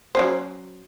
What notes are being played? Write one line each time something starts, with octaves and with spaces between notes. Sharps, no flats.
F#3 C#4 C5